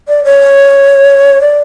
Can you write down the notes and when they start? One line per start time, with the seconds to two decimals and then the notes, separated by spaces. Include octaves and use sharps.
0.08 D5
0.24 C#5
1.41 D5